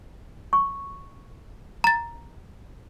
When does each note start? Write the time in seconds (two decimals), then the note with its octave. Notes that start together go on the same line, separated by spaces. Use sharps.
0.53 C#6
1.84 A#5 A6